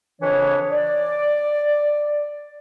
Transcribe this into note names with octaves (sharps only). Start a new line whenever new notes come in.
F2 C#3 E3 D4 C#5
D5